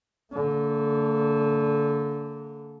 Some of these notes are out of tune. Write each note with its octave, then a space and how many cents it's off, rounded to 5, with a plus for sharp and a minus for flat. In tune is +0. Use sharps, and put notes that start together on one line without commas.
D3 -25 A#3 -45